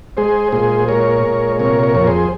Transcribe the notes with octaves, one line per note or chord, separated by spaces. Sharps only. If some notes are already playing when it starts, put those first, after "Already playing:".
G#3 G#4 C5
A#2 G#4 C5
G#3 A#4 C#5
A#2
C3 A#4 C#5
A#4 C#5
F2 A#4
G#4 C5